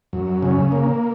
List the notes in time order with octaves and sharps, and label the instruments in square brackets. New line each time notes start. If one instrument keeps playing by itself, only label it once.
[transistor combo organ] F#2
C#3
A#3